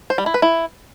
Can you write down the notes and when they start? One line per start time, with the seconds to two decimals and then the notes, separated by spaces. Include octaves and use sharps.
0.10 C5
0.18 G3
0.26 E4
0.34 B4
0.42 E4